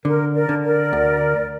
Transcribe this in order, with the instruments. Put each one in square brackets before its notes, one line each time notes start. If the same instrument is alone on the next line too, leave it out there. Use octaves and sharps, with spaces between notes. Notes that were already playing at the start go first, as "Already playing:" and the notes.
[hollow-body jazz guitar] D3 [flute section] A#4
[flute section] A#4 D5
[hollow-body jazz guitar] D3
[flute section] A#4 D5
[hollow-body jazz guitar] D2